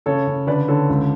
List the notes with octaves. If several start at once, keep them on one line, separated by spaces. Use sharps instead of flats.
C#3 A4 C#5
C#3
D3 B4 D5
D3 A4 C#5
C#2